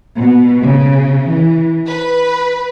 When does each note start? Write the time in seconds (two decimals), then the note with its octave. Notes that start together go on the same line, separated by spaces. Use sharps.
0.17 B2
0.62 C#3
1.28 E3
1.88 B4